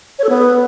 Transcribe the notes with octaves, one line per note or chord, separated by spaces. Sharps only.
C#5
A4
B3